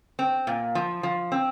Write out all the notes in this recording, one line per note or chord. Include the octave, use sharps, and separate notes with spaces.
C4
A#2
F3
F3
C4